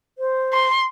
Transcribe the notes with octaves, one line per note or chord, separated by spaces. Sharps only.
C5
C6